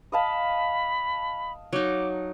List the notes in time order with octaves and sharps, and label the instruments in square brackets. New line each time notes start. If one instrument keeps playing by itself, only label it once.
[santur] D#5 F5 A5 [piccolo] B5
[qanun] F#3 D#4 [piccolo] D6